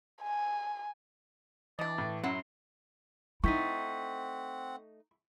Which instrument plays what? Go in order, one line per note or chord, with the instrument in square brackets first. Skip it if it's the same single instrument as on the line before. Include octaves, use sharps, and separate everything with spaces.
[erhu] G#5
[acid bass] E3 [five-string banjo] D4 D#5 [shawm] D5
[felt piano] A2
[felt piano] F#2 [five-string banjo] F#3 E4 F#5 [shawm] C6
[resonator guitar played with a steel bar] A3 D#4 [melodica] C4 F#5 [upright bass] E4 [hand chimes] C#6 G6 B6